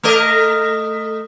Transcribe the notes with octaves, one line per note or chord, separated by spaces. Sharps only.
A3 A#4 D#5